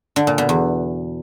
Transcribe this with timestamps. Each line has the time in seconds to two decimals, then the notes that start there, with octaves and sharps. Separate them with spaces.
0.16 D3
0.27 A#2
0.38 B2
0.49 E2